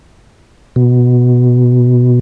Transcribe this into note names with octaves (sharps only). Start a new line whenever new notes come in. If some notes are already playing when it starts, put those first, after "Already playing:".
B2